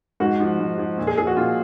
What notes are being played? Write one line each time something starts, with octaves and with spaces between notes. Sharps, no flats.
G#2 F#4
F3
G#2
F3
A#2
G#4
F3 G#4
F#4
A#2 F4